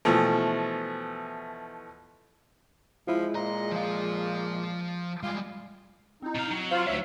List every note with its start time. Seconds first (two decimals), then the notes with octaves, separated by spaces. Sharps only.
0.05 B2 E3 F3 A3
3.07 F3 G#3 E4 F4
3.35 A#2 D#5 A#5
3.72 F3 F5
5.23 G3 G#3 F4
6.22 C4 D#4 E4
6.35 B2 F5
6.51 F#3 C4
6.71 F4 C5 F5 G6
6.87 D2 F#3 D#4 C#5 E5